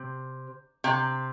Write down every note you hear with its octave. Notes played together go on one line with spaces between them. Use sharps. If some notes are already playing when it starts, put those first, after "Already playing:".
Already playing: C3
C3